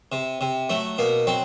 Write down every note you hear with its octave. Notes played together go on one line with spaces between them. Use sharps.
C3
C3
F#3 A3
B2 A#3
F#3 C4